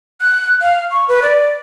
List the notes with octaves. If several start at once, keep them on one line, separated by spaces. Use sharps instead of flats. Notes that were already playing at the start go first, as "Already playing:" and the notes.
F#6
F5
C#6
B4
D5